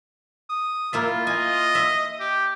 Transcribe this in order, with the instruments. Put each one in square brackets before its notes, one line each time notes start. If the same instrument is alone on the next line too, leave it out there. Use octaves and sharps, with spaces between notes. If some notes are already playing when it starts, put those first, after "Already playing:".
[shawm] D#6
[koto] A#3 E4 E5 [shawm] F4
[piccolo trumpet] D#5 [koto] G#5
[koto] E5
[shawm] G4